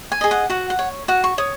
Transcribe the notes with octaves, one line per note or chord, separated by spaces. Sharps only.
G#5
G#4 D#5
F#5
F#4 F#5
F#5
C#5
F#4 F#5
C#6
C#5 D#6